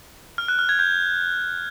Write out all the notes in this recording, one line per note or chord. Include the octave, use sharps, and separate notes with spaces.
F6
F#6
F6
G#6
G6